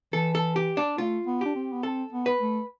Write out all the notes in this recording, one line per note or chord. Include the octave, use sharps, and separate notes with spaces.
E3 A4
A4
G4
D4
A3 F4
B3
D4 G4
C4
B3
C4 A4
B3
B4
A3